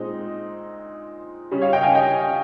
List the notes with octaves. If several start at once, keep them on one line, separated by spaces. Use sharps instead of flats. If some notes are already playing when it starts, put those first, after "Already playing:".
Already playing: A#2 G#3 C4 D#4 D#5
C#3 G3 C#4
C#5 F5
D#5 G5
F5 G#5
D#5 G5